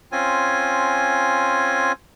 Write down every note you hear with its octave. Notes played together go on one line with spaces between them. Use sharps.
C4 C#4 F4 G#5